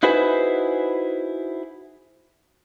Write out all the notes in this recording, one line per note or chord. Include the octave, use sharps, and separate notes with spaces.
D#4 E4 F#4 G#4 B4 C5